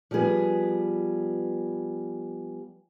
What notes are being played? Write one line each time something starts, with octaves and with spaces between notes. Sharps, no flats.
F3 G3 B3 G#4 B4